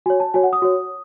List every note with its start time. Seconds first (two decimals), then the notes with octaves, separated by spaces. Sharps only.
0.06 F#4 C#5 G#5
0.20 A5
0.34 F#4 C#5 G#5
0.43 F#5
0.53 D#6
0.62 F#4 C#5